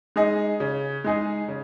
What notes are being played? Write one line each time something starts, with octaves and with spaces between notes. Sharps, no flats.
G#3 D#4 G#4 D#5
C#3
G#3 D#4 G#4 D#5
C#3